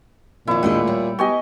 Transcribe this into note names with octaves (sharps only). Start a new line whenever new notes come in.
F2 A#2 D#3 E4
D#2 A2 G#3 A3 D4 D#5
G3 C#5
B3 G4 D#5 G#5 C#6